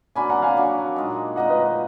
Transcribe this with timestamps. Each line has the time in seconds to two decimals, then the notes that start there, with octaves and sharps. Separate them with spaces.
0.15 F#3 A#3 D4 F#4 G#5 B5
0.30 F#5 A#5
0.42 F5 G#5
0.57 F#3 A#3 D4 F#4
0.96 A#2 G#3 D#4
1.36 A#2 G#3 D#4 D#5 F#5
1.50 B4 D#5